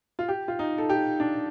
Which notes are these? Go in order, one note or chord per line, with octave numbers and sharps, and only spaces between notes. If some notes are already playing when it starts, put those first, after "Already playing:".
F4
G4
F4
D#4
A4
G4
D4